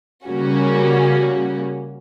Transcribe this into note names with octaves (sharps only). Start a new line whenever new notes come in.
C#3 G3 A#3 C#4 F#4